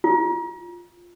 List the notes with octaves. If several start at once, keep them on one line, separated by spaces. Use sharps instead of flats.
F4